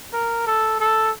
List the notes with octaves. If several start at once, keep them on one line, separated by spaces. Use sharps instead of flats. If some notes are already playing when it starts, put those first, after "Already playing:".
A#4
A4
A4